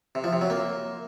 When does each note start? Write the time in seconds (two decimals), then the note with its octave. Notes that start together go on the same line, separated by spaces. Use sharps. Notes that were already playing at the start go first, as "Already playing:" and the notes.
0.15 C3
0.24 F3
0.33 C3
0.41 F#3
0.50 A#3